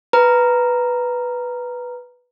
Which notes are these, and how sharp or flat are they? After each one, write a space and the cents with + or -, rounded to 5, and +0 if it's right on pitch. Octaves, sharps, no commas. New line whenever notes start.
B4 +0 A#5 +0